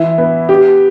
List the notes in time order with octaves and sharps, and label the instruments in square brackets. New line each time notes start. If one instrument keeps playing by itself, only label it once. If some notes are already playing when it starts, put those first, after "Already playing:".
Already playing: [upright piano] E3 E4
B3
G4